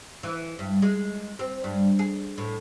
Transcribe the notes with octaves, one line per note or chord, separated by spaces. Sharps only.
E3
G2
G#3
C4
G2
G#4
A2